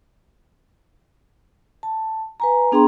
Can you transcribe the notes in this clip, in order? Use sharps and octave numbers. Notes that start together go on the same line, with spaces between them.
A5
B4 G#5 A#5
B3 D4 G#4 G5 A#5 C6